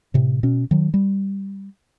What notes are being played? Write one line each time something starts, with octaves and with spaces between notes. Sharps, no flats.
A2 C3
B2 C#4
D#3 F#3
G3